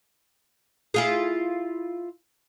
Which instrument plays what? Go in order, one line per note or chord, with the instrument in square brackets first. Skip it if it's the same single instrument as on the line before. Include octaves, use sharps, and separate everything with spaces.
[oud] E4 F4 G#4